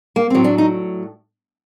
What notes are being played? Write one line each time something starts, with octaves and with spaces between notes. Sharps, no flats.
A#3
A2 F#3 C4
D4
D#4